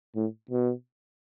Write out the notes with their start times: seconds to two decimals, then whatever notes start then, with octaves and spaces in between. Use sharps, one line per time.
0.15 A2
0.51 B2